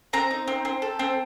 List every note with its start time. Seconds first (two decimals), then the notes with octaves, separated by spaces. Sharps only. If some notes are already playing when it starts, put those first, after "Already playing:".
0.13 C4 A#5
0.31 D#4
0.48 C4
0.65 C4
0.82 A4
0.99 C4